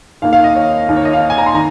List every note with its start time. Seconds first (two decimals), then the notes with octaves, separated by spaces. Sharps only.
0.22 D#2 D#3 A#3 F5
0.33 F5
0.44 D#5
0.55 C#5
0.88 D#2 D#3 A#3
0.96 C#5
1.05 D#5
1.13 F5
1.30 G#5
1.38 A#5
1.46 C6
1.55 D#3 A#5